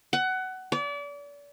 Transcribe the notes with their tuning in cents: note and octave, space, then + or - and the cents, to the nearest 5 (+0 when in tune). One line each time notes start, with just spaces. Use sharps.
F#5 +20
D5 -35